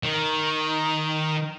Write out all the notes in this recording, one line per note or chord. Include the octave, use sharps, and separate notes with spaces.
D#3